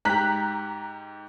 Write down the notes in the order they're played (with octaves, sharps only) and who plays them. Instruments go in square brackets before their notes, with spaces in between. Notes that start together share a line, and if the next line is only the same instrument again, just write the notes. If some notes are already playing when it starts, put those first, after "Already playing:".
[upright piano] G#2 G4 [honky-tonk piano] A#5 F#6 B6